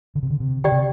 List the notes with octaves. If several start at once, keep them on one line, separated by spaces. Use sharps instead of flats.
D3
C3
D3
C3
D3 G4 D5 G5
C3